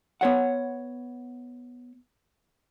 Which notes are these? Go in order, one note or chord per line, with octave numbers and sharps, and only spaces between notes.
B3 C#5 F#5